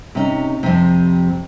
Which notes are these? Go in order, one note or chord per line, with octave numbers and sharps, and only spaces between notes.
C3 C#4 D#4
F2 C3